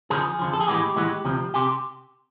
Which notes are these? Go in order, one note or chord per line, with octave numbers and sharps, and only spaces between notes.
F2 D3 F3 G#4
F2 D3 F3
A4
G#4
A2 E3 G#3 B3 G4
A2 E3 G#3 B3
D2 C3 F3
C3 G4